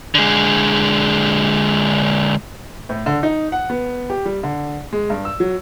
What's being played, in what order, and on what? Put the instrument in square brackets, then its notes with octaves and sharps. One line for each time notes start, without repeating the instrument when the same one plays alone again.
[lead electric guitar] D3 G#3
[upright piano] A2
D3
D#4
F#5
B3
G4
G3
D3
G#3
G2
E6
F#3